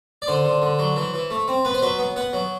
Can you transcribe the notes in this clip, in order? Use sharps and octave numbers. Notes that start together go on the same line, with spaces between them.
D5
D3 C5
D3
D3
F#3
E3
E3
A3
C4
B3 B4
C5
F#3 B4
B3
B3 F#5
F#3